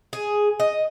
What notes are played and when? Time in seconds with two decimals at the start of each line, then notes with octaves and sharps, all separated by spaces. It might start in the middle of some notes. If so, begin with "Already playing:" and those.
0.13 G#4
0.60 D#5